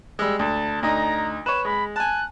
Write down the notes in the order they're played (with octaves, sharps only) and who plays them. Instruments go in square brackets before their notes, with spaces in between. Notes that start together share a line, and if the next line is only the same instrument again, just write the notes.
[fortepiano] G3 G#3 [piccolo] E6
[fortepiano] D2 [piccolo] A5
[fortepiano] D2 D#4 [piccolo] A#5
[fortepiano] B4 C#5 [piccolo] E7
[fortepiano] G#3 [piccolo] B5
[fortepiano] G#5 A5 [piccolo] F#6